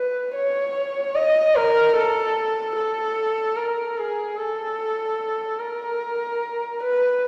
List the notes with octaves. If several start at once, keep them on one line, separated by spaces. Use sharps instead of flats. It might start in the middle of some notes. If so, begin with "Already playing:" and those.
Already playing: B4
C#5
D#5
A#4
A4
A4
A#4
G#4
A4
A#4
B4